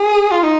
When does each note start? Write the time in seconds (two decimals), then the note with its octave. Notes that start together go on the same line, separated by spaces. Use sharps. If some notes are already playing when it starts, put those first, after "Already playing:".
Already playing: G#4
0.32 F4
0.43 D#4